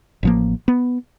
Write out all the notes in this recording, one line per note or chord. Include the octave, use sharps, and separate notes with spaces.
A1 F3 A#3
B3